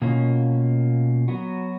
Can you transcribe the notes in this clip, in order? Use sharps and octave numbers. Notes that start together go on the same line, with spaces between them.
B2 A#3 C#4 F4
F#3 B3 F#4